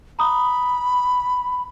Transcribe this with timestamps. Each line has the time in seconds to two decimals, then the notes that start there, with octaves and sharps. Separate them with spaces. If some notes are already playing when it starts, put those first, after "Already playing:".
0.19 A#5 B5 D#6